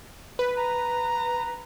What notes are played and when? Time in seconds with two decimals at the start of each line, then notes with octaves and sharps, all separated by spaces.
0.39 B4
0.57 A#5